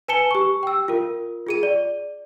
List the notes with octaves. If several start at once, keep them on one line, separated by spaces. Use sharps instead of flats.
B4 G#5 A5 C#7 E7 G7
G4 C#6
G5 E6
F4 A#4
F4 G#4 D#7
D5